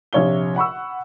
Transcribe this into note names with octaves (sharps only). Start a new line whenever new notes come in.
A#1 C3 C#5 F5 G7
F#5 B5 C#6 E6